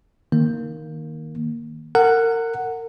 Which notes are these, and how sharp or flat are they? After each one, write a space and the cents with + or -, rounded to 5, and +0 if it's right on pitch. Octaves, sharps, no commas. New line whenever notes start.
D#3 +0 A#3 +0
A#4 -30 F#5 +0